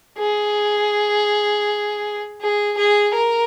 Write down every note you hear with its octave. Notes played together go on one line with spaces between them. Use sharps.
G#4
G#4
G#4
A#4